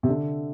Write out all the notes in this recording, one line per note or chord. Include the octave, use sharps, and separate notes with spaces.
C3
D3